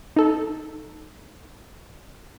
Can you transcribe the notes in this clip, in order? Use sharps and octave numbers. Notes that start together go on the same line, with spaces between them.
D#4 A4